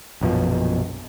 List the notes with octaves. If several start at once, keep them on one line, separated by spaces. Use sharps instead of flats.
A#1 F#2 B2 F3